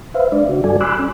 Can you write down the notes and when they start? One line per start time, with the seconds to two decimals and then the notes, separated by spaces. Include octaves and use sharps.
0.14 B4 C5 E5 F5
0.32 G#3 D4 D5
0.49 C#3 F#4
0.64 G2 G3 F#4 A4 D5 G#5
0.81 G#5 B5 C6 D6 E6 F#6
0.99 C#4